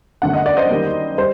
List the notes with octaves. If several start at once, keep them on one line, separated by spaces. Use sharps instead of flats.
G1 F#2 D3 A3 F#5
D#5
D5
C5 D#5
F#2 D#3 G3 A#3
G3 C5